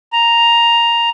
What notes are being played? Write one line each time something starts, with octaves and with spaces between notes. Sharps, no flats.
A#5